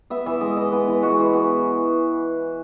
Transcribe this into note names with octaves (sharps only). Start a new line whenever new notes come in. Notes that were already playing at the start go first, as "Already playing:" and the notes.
B3 E5
E3 E5
G#3 D#5
E3 D#5
B3 B4
E3
G#3 F#4
E3
B3